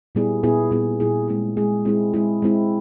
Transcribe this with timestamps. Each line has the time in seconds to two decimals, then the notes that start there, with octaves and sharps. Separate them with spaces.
0.15 A#2 G3 B3 E4 G#4
0.43 A#2 G3 B3 E4 G#4
0.71 A#2 G3 B3 E4 G#4
1.00 A#2 G3 B3 E4 G#4
1.28 G#3 C4 E4 G#4
1.57 G#3 C4 E4 G#4
1.85 G#3 C4 E4 G#4
2.14 G#3 C4 E4 G#4
2.42 G#3 C4 E4